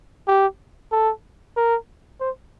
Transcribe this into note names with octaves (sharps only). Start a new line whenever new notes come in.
G4
A4
A#4
C5